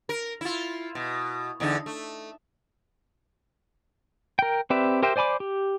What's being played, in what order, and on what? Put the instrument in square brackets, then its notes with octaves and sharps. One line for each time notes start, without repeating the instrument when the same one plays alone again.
[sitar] A#4
E4 F4
B2
E2 D3 D#4
A3
[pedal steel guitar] A#4 G5
C4 G4 B4 D5 E5
G4 A#4 C5 E5 G5
C5 D5 G#5 B5 D6
G4